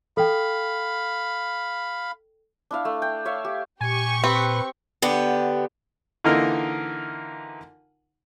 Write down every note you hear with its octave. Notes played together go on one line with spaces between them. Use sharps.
A4 F5 G5 B5
D4 E4 F5
A3
G5
C#5 E5 F5
G4
A#2 G4 G#5 C#6
C4 B4
D3 B3 G4
D3 E3 A#3 D#4 F4 A#4